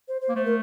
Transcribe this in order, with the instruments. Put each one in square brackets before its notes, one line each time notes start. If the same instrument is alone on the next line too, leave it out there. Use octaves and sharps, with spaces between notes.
[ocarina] C5
C5
[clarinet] A#3
[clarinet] A3 [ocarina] C5
[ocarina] A#4